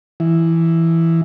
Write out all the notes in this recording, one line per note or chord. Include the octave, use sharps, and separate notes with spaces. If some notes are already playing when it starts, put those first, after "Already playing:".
E3